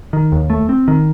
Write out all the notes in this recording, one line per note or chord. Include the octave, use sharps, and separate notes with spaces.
D#3
D#2
A3
C4
D#3